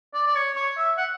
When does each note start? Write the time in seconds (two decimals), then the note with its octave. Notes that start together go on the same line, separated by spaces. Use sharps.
0.14 D5
0.27 D5
0.35 C#5
0.55 C#5
0.77 E5
0.98 F#5